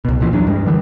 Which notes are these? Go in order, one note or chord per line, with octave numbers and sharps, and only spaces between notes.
C2 B2
C2 A#2 E3 F3
E2 F#3 D4
G2 G3 G#3
D3 E3